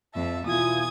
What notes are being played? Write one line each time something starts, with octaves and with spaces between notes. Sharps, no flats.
F2 E5 A5
E2 B2 E4 F4 G#5 D#6 G#6